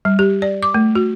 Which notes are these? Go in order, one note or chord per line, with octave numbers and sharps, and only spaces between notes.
G3
G4
D5
D6
A3
F#4